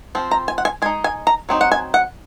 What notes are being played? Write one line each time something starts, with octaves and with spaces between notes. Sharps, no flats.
F3 C4
A#5
G#5
F#5
G#5
G#3 D#4 G#5
G#5
A#5
F#3 C4 D#4
F#5
G#5
F#5